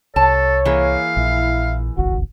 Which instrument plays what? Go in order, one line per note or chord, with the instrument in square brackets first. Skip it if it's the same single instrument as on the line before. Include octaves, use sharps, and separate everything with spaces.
[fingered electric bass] C2 [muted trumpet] A4 [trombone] C#5 [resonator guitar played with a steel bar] A5
[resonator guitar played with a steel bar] E3 A#3 G#4 [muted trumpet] F5
[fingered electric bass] A#1 [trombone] E4
[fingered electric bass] D#1 G#1 C#2 [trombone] F#4